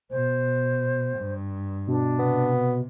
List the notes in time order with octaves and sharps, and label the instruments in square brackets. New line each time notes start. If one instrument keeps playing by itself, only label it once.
[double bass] B2 [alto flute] C5
[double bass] G2
[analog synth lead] B2 [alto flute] D4
[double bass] C3 [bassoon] B3